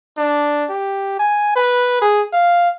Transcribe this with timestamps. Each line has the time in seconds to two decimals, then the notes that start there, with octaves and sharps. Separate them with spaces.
0.18 D4
0.70 G4
1.19 G#5
1.56 B4
2.02 G#4
2.33 F5